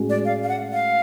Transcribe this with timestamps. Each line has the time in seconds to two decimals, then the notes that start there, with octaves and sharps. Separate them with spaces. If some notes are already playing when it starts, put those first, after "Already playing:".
Already playing: A2 G#3 C#4 F#4
0.09 D5
0.25 F5
0.43 F5
0.49 F#5
0.73 F5